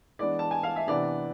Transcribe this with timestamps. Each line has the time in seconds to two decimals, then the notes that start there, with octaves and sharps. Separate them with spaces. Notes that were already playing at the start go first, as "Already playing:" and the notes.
0.19 E3 G#3 B3 D4 D5
0.39 A5
0.51 G#5
0.63 F5
0.76 E5
0.87 C3 E3 B3 D4 D5